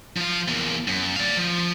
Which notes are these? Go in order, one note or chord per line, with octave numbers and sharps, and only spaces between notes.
F3 F5
E2 A#3
F#2
D5 F5
F3